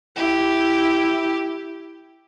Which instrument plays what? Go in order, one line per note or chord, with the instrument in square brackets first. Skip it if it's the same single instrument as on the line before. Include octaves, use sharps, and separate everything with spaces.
[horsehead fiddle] E4 [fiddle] G4